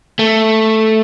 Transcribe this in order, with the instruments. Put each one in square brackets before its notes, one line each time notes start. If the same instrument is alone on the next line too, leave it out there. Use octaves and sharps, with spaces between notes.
[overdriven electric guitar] A3